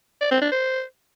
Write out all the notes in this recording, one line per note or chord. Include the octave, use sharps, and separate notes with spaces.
D5
C4
D4
C5